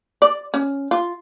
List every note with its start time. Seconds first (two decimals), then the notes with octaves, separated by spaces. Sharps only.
0.22 D5
0.54 C#4
0.91 F4